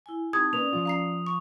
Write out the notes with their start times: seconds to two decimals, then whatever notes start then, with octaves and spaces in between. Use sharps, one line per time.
0.06 E4 G#5
0.33 C4 D#4 G4 A5 D#6 G#6
0.53 A#3 C#4 B4 D5 F7
0.73 F3 F4
0.85 F5 A#5 C7
1.26 C#6